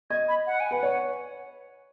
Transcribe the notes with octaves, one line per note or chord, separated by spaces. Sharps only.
D#5 G#6
B5
F#5
G#5
B4 F#5
C#5